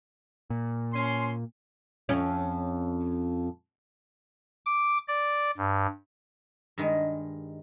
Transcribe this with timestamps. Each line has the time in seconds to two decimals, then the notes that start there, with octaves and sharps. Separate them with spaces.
0.50 A#2
0.93 F3 C#4 C6
2.09 F2 C#4
4.66 D6
5.08 D5
5.57 G2
6.78 G2 D#3 G#3